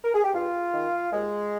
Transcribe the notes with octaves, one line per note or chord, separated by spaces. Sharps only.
A#4
G#4
G4
G2 F4
D#3
D#2 G#3